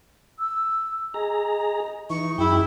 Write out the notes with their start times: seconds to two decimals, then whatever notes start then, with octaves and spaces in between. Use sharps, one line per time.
0.39 E6
1.14 G#4 D#5 A#5
2.10 E3 D#4 C#6
2.38 F#2 E4 G#4 G5